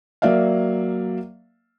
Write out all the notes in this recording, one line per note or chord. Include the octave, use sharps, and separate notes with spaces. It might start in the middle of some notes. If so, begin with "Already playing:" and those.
F#3 A#3 D5 E5 F5